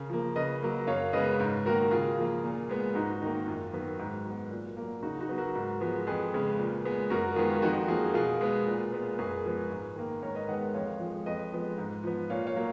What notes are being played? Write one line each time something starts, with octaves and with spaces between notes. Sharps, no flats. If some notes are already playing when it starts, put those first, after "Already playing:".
Already playing: C#3 A#4
F3 A#3
C#3 B4 D#5
F#3 A#3
F#2 C#5 F5
C#3 G#3 B3 B4 D#5
G#2
D#3 A#3 F#4 A#4
C#3 F4 G#4
F3 A#3
A#2
G#3 B3
G#2 D#4 F#4
D#3 A#3 D#4
F#2 F4
D#3 F#3 B3
G#2
F#3 B3
A#2
F#3 A#3
C#3 D#4 F#4
D#4 F#4
F#3 B3
F#4 A#4
G#2
F3 G#3 B3
F2 G#4 B4
C#3 G#3 B3
A#2
G#3 B3
F#2 F#4 A#4
D#3 G#3 B3 F4 G#4
F2 D#4 F#4
F3 A#3 F4 G#4
B2 F4 G#4
G#3 B3
A#2
G#3 B3
F#2 G#4 B4
F3 G#3 B3
G#2
D#3 A#3
G#2 A#4 C#5
B4 D#5
D#3 G#3 B3 D#5 F#5
F2 C#5 F5
F3 G#3
F2 B4 D#5
F3 G#3 B3
G#2
F3 B3
A#2 C#5 F5
C#5 F5
F#3 A#3